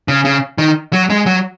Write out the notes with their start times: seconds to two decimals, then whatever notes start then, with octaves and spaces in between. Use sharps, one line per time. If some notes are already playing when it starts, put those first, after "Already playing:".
0.08 C#3
0.25 C#3
0.58 D#3
0.93 F#3
1.10 G#3
1.26 F#3